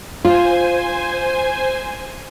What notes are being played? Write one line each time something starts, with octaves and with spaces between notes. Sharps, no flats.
F4 C5 G#5